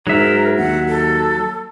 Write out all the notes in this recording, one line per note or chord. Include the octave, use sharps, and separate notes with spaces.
G#2 F#3 A#4 E5
D#2 F#5
A4